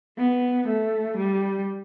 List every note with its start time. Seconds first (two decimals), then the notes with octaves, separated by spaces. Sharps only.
0.18 B3
0.68 A3
1.17 G3